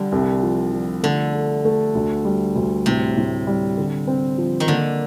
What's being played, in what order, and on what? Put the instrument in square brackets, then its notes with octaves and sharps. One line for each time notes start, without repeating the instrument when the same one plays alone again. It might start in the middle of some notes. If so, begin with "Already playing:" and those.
Already playing: [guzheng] D3 [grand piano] G3
[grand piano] C2
F3
F3
[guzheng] D3 [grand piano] A3
[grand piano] A4
A3
D2
G3
D2
[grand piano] A2 [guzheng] C3
[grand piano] A2
G3
D3
C4
F3
[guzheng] D#3
[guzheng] D3 [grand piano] A#3